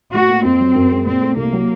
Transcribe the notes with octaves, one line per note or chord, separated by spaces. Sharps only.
A2 F#4
A#3
F2 C4
F#3
F#2
G#3
A#2 C4
A3
C2 A#3
F#3